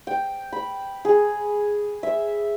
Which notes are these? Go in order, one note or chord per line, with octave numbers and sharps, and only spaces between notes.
G5
B5
G#4
E5